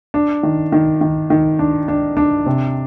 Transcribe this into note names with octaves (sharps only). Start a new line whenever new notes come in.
D4
D#3
D#3
D#3
D#3
D4
D4
D4
C3